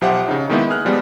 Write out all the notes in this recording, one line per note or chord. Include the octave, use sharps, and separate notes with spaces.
B1 F3 G4 C5 E5 F#5
C#3 D#4
D#3 G#3 A#3 B3 D#4 E4
G#4 F6 F#6
F3 G3 G#3 B3